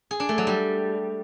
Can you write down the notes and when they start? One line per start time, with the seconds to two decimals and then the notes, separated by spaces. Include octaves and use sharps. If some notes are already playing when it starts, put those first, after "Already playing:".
0.11 G#4
0.20 D4
0.29 A3
0.38 F#3
0.47 G3